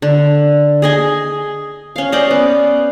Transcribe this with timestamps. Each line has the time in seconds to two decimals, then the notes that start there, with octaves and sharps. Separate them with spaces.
0.02 D3
0.82 G#4 D#5 G#5
1.96 C#4 F5
2.12 C#4 C5 D5 D#5
2.31 B3